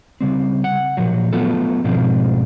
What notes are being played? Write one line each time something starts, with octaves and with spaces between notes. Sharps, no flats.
C#3 G3 C4
F#5
A#2 F3 F#3
F#3 A3 B3 F4 A4
G#2 B2 F3 C4 D4 F4